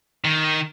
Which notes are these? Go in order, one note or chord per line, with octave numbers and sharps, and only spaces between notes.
D#3